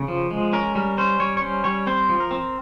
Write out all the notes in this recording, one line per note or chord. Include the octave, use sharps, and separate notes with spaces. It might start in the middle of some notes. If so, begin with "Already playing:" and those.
Already playing: C#3
F3
G#3
C#4 A#4
G3 A#4
C#4 C5
G3 C#5
C#5
C#4 C5
G3 C#5
C4 C5
F3
A#4
C4